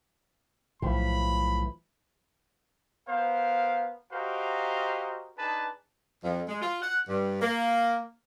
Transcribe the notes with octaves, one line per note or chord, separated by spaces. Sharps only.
B1 A2 E3 F3 B5
B3 A#4 C5 F5
F#4 G4 A#4 C5 D#5 F5
D4 D#4 G#4 B4 A5
F2
G#3
F4
F#5
G2
A#3